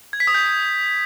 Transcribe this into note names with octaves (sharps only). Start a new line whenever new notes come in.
G#6
B6
D#6
G6